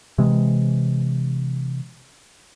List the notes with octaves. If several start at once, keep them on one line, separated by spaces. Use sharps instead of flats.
C3 E3 G#3